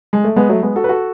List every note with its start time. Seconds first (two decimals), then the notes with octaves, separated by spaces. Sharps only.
0.13 G#3
0.24 A3
0.36 G#3 B3
0.49 F#3 A3
0.62 G#3 B3
0.76 F#4 A4
0.84 B4
0.89 F#4 A4